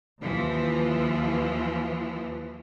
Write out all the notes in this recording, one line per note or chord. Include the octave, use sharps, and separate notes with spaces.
D#2 E3 F3